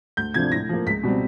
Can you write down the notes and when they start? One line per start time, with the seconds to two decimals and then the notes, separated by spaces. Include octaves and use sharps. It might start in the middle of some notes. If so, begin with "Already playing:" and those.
0.17 D2 G6
0.34 C3 F3 A3 D4 G#6
0.51 A2 A#6
0.69 F3 A#3
0.86 C#2 B6
1.03 B2 G3 C4